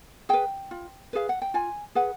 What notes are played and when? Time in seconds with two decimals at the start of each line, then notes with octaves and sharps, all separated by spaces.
0.29 G#4 B4 G5
0.71 F4
1.13 G#4 B4 F5
1.29 F#5
1.42 G5
1.54 F4 G#5
1.95 G#4 B4 F#5